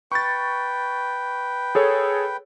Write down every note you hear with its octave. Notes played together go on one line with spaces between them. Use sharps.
B4 G5 C#6 A6
G#4 A4 C#5